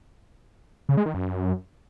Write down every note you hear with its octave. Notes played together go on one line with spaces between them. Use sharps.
C#3
G#3
D#3
F#2